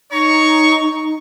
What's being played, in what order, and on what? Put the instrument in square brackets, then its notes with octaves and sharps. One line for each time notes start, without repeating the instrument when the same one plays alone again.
[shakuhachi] D#4 [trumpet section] C#5 A#5 C#6